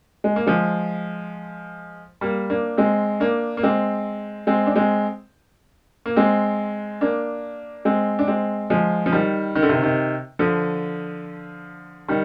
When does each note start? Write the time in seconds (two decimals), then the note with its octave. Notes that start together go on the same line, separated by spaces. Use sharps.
0.24 G#3
0.36 A#3
0.46 F3 G#3
2.21 G3 A#3
2.50 A#3 D4
2.77 G#3 C4
3.20 A#3 D4
3.57 A#3
3.63 G#3 C4
4.47 G#3 C4
4.66 D4
4.76 G#3 C4
6.06 A#3
6.16 G#3 C4
7.01 A#3 D4
7.85 G#3 C4
8.19 D4
8.28 G#3 C4
8.70 F3 G#3
9.06 F3
9.12 D#3 G3
9.55 D#3
9.63 D3
9.69 C3 D#3
9.83 C3 D#3
10.39 D3 F3
12.08 D#3 G3